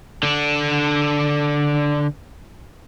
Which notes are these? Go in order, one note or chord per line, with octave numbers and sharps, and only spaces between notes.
D3 D4